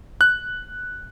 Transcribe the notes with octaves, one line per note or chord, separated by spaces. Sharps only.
F#6